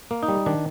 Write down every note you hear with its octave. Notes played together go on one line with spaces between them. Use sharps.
A#3
D#4
G3
D#3 D4